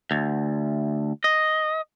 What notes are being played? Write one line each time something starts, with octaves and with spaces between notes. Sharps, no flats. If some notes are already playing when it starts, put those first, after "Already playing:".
D2
D#5